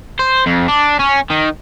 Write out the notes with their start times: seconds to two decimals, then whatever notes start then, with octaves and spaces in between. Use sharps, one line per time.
0.19 C5
0.46 F2
0.69 D4
1.00 C#4
1.30 D#3